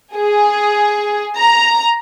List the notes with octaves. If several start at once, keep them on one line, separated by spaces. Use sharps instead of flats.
G#4
A#5